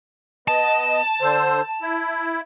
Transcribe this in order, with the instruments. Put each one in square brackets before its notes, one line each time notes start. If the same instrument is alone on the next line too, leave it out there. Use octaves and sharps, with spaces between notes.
[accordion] B3 D#5 [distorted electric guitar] A5
[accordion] D3 C5 E6
E4